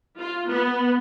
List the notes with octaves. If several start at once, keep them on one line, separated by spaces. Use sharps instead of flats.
F4
B3